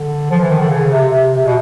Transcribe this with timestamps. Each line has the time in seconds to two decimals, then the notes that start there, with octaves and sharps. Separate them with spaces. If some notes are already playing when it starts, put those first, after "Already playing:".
Already playing: D3
0.30 F3
0.40 E3
0.50 D#3
0.60 D3
0.69 C#3
0.92 C3
1.14 C3
1.37 C3
1.45 B2